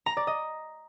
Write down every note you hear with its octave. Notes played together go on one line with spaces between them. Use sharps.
A#5
D5
D#5